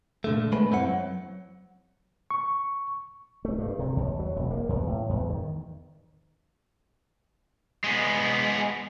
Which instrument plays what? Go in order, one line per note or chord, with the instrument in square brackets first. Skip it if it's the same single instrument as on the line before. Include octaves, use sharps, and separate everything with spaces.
[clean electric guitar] A#2 D3 A3
G#3 A3 B3 B4
F#2 C4 E4 G#4 F#5
F#3
[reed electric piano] C#6
[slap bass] A3
G2
C3
D#2
F#3
E1
A#3
E2
A2
E2
D#3
[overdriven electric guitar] G#3 B3